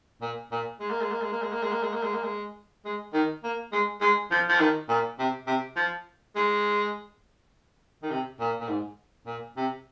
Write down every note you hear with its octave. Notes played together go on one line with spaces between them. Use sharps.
A#2
A#2
G#3
A#3
G#3
A#3
G#3
A#3
G#3
A#3
G#3
A#3
G#3
A#3
G#3
A#3
G#3
G#3
D#3
A#3
G#3
G#3
F3
F3
D#3
A#2
C3
C3
F3
G#3
D#3
C3
A#2
A#2
G#2
A#2
C3